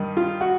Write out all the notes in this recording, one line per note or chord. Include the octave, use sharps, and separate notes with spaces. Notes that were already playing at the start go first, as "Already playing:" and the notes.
Already playing: G2 D#3
F4
F#4